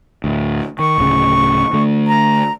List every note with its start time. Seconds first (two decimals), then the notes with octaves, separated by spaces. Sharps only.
0.24 D2 A2
0.79 D#3 C#6
0.98 D1 D2 C#3
1.73 D3 A3
2.07 A#5